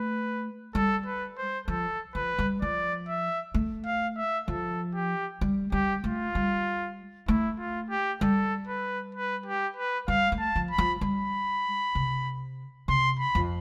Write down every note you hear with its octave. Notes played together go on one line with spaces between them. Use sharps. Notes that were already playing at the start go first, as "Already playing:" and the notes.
Already playing: A3 B4
G3 A4
B4
C5
F3 A4
F3 B4
G3
F3 D5
E5
A3
F5
E5
F3 A4
G4
G3
G3 G4
A3 F4
G3
A3 E4
F4
G4
G3 A4
B4
B4
G4
B4
G3 F5
A3
A5
F3
B5
F3
G3 B5
C3
C3 C6
B5
F2